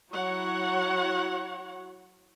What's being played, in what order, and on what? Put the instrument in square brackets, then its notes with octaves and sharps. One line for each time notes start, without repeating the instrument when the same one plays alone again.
[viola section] F#3 E4 F#4 C#5 F#5